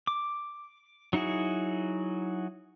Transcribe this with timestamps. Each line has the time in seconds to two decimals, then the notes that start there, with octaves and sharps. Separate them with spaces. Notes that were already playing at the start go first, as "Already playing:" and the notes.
0.07 D6
1.13 F#3 D#4 E4 F#4 G#4